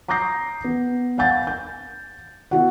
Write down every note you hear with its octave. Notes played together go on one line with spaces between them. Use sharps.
A#5 D6 D#6 G6 A#6 C7
B3
F5 F#5 G#5 G6 A6
G6
B3 E4 F#4 F#5